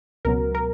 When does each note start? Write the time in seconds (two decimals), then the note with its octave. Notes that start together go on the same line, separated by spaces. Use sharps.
0.25 C#2 B2 F#3 A#4
0.55 A#4